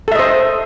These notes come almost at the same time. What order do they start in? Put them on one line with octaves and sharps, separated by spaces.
A4 E5 D#5 C5